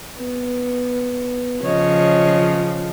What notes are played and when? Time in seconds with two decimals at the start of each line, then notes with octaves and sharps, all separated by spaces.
0.18 B3
1.63 C#3 F3 C#5 D#5